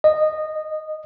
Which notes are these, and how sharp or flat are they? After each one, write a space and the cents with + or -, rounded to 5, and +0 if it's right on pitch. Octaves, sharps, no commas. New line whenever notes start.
D#5 -15